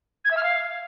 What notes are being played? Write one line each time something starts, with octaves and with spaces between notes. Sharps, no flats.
G#6
E5
F6
F5